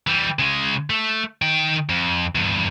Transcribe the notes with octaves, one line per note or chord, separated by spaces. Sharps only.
E3 G3
C#3 G#3
A3
D#3 G5
F2
E2 G2